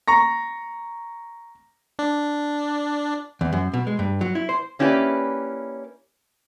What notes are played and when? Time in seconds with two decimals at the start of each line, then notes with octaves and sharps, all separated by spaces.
0.08 A#5 C#6 A#6
1.99 D4
3.41 E2
3.53 F#2
3.74 B2
3.87 G#3
3.99 G2
4.21 F#3
4.35 E4
4.49 C5
4.79 A#3 C#4 E4 G4 B4 D5